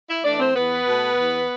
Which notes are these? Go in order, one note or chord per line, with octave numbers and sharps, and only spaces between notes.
E4 E5
E3 A3 D4 D5
C4 C5
E2 B3 B4
B2 A3
E2